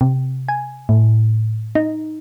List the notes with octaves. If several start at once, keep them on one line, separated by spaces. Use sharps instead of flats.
C3
G#5
A2
D#4